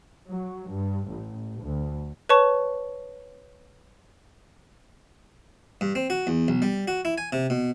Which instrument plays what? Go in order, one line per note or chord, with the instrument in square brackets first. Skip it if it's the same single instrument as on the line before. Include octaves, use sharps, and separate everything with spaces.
[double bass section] F#3
G2
A1
D2
[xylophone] B4 C#5 A5 C#6
[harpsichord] G2
C4
F#4
E2
B1
G3
F#4
E4
G#5
C3
B2